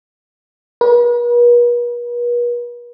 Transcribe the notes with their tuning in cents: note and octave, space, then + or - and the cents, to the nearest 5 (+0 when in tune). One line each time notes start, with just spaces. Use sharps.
B4 -45